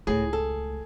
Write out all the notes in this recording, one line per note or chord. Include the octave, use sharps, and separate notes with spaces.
C#2 A2 A3 G#4
A4